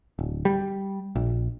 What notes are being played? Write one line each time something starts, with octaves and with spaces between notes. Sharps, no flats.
D1
G3
A#1